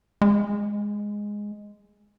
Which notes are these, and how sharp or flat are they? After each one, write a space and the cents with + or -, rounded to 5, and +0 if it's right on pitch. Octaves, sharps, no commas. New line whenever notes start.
G#3 -5